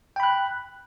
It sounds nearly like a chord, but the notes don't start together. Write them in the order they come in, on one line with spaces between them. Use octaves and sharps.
G5 B5 F#6